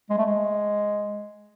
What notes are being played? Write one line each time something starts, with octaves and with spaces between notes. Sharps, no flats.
G#3
A3
G#3